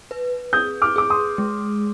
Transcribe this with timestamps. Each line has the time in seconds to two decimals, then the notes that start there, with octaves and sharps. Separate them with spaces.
0.11 B4
0.53 G#4 D#6 G6
0.82 D6 F6
0.96 G#4 D6
1.10 C6 D#6
1.38 G#3